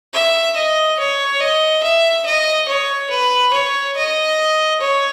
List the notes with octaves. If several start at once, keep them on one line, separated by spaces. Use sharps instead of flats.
E5
D#5
C#5
D#5
E5
D#5
C#5
B4
C#5
D#5
C#5